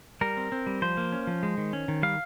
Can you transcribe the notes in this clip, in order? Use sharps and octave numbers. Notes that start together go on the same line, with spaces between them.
G3 A#4
C4
C4
G3
F3 C5
A#3
C#4
F3
G#3
D#3
C#4
D#3
G3 F5